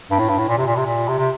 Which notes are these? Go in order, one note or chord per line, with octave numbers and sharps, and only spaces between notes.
G2
A2
G2
A2
A#2
C3
A#2
C3
A#2
C3
C3